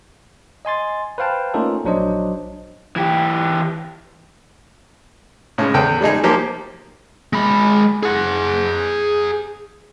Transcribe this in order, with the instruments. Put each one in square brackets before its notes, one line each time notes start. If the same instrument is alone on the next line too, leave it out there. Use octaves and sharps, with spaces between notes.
[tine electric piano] D#5 G#5 C6 A6
B4 C5 F5 G5 A5
A3 A#3 C#4 D#4 F4 A4
A#1 F#3 D4 C5 D#5
[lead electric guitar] E3 G4
[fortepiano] A2 C#3 G#3
E2 A4 G5
G3 G#3 D#4 G#4
F3 A#3 G4
[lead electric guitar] G#3 B5
G#4 F#5